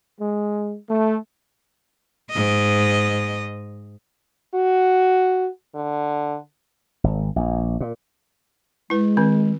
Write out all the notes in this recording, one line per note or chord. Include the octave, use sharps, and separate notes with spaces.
G#3
A3
G#2 D#5
F#4
D3
G#1
A#1
A#2
G#3 E4 B4
D#3 C4